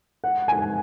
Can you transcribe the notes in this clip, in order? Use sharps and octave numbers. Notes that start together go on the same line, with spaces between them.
F#5
G#5